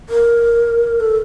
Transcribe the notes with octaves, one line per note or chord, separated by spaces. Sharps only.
A#4
A4